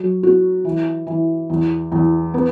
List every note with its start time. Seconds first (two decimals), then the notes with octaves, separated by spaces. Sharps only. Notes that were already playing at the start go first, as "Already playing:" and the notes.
Already playing: F#3
0.23 F#4
0.65 E3
1.07 E3
1.50 E2
1.92 E2
2.34 B3